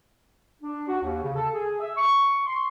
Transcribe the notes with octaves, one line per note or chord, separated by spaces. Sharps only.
D4
F#4
D#2
C#3
A4
G#4
E5
C#6
C6